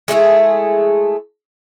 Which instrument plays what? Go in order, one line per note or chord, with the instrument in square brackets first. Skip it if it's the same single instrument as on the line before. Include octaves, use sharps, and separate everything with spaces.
[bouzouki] G#3 A3 E4 G#4